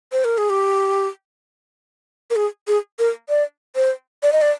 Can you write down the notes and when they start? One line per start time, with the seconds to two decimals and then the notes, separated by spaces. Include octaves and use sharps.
0.12 C5
0.25 A#4
0.38 G#4
0.50 G4
2.30 A#4
2.36 G#4
2.68 G#4
2.99 A#4
3.29 D5
3.76 C5
4.23 D5
4.33 D#5
4.42 D5